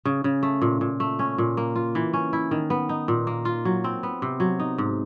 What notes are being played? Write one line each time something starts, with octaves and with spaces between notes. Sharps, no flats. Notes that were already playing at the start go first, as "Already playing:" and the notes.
C#3
C#3
A3
A#2
A#2
A3
C#4
A#2
A#3
F4
E3
C#4
E4
D#3
B3
D#4
A#2
A#3
F4
F#3
C4
B3
C3
F#3
D#4
G#2